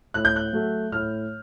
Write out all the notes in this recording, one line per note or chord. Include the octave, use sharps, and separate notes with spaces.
A2 F#6
G6
F#6
F#3 A3
A2 F6